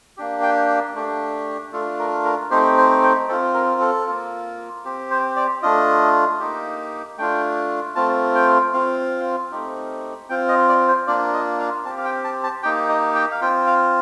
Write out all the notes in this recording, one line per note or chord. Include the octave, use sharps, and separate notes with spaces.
A#3 D4 G4
G5
A3 D4 G4
A3 D4 F4 A4
A#4
A#4
A3 C4 D#4 G4 C5
C5
G5
C4 F4 A4
A#4
A4
A#3 F4
C4 G4
C5
D5
A3 D4 F4 D#5
A#3 D#4 G4
A3 D4 F4 G5
A3 C4 F4 A5
G5
C4 F4 F5
A3 C4 D#4 G4
C4 F4 G5
D#5
D5
C5
A#3 D4 F4 D5
D#5
F5
C4 G4 A5
F5
G5
A5
A5
A#3 D#4 G4 G5
D#5
G5
F5
C4 F4 G5
F5